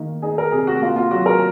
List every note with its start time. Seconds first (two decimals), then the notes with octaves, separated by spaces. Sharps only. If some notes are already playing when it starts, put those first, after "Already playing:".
Already playing: D#3 A#3
0.22 D#4 G#4
0.38 A#4
0.52 C3 G#4
0.67 F#4
0.82 A#3 F4
0.96 F4
1.11 F#3 F#4
1.26 A#4